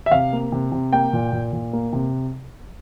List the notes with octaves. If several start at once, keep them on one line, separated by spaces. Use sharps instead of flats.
E5
C3 F5
A#3
C3
C3
A#3 G5
A#2
A#2
A#2
A#3
C3